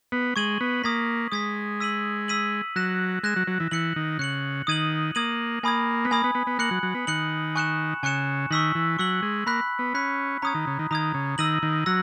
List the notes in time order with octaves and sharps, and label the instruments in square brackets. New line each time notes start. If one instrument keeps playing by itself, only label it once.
[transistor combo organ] B3
[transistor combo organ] G#3 [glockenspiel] C#6 G#6 D#7 F#7
[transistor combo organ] B3
[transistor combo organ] A#3 [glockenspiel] D#6 G#6 B6
[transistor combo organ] G#3 [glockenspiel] D#6 G#6 B6
[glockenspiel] E6 B6 D#7 F#7
E6 B6 D#7 F#7
[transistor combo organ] F#3 [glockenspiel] F#6 A#6 E7
[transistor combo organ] G#3 [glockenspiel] F#6 A#6 E7
[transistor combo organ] F#3
F#3
E3
[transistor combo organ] E3 [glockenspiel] F#6 C#7 F#7
[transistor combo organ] D#3
[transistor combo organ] C#3 [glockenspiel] F#6 C#7 F#7
[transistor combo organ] D#3 [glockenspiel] D#6 G#6 D#7 F#7
[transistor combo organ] A#3 [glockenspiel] D#6 G#6 D#7 F#7
[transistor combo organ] A#3 [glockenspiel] G#5 B5 D#6 G#6
[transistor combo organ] B3
[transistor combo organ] A#3 [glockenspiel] G#5 B5 D#6 G#6
[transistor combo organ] B3
B3
B3
[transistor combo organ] A#3 [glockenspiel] F#6 C#7 F#7
[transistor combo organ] F#3
F#3
B3
[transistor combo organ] D#3 [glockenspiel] F#6 C#7 F#7
[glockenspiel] G#5 C#6 F#6 C#7 E7
[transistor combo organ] C#3 [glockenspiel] G#5 C#6 F#6 C#7 E7
[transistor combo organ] D#3 [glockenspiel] C#6 E6 B6 F#7
[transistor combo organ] E3
[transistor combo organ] F#3 [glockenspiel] C#6 E6 B6 F#7
[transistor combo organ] G#3
[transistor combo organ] A#3 [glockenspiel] B5 F#6 B6
[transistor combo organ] B3
[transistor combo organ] C#4 [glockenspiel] B5 F#6 B6
[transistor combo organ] C#4 [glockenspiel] A#5 D#6 G#6
[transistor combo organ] D#3
C#3
D#3
[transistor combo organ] D#3 [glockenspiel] A#5 D#6 G#6
[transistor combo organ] C#3
[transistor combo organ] D#3 [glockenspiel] E6 A#6 D#7 F#7
[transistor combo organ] D#3
[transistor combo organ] F#3 [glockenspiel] E6 A#6